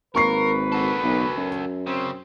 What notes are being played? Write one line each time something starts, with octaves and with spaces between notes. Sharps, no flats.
G#1 A#3 A#4 B4 C#6 C7
F#4 A4
B1
F#2
C#3 C4